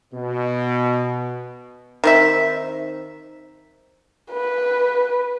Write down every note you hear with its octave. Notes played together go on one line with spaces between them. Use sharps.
B2
D#3 C4 E5
B4